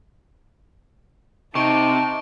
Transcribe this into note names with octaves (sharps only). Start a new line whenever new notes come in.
C3 D#4 A5 C#6 D7 G7